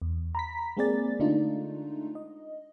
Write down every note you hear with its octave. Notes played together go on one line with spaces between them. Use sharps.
E2
A#5 B5 B6
G#3 A#3 C4 G#4 D5 A6
D3 G#3 A3 D4 D#4 F4
D#5